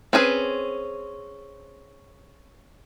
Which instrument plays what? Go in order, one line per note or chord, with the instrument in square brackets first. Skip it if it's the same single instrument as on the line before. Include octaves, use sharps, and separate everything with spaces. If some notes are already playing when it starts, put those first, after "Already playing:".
[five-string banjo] C4 C#4 G#4 A#4 B4